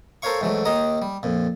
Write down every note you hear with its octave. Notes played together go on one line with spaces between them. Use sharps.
A4 A#4 C5 C#5 F5 C#6
G#2 E3 F#3 A3
D#2 D#3 D#5 A#5 D#6
G3
F2 A#2